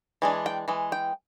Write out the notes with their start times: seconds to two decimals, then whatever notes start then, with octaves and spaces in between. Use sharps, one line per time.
0.22 E3 G#3 D4
0.46 G5
0.68 E3 G#3
0.92 G5